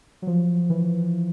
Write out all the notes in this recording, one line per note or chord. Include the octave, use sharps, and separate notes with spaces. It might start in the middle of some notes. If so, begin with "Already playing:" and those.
F#3
F3
E3